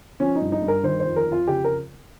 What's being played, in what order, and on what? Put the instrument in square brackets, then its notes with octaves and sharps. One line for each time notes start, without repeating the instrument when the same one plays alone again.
[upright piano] F3 C#4
D#4
G2
D#4
G2
A#4
D#3 C5
C5
F2
A#4
F2
F4
C#3 G4
A#4